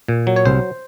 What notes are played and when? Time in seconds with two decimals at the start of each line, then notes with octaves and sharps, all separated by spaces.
0.08 A#2
0.27 F#3
0.36 C#5
0.45 C2 C5